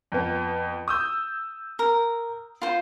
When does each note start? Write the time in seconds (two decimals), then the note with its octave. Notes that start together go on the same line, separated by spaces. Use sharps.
0.12 F2 B3
0.88 D#6 E6 G6
1.79 A#4
2.62 F4 C5